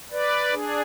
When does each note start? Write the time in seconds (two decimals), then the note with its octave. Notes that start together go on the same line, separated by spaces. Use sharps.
0.12 B4 D5
0.53 D4 G#4